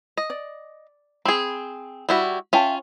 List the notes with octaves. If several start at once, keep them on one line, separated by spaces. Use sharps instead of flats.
D#5
D5
C4 G#4 B5
G3 E4 F#4
C#4 F4 E5 G5 A5